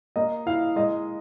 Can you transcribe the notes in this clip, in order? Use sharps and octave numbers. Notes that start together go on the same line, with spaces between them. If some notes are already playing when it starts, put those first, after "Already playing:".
A#3 D#5
E4 F5
G#3 D#5